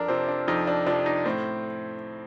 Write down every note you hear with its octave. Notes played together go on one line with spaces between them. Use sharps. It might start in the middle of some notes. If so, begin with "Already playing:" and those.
Already playing: F2 D4 A#4
C3 F3 C4
D4
F2 D#4
D4
C3 F3 D4
D#4
A2 C4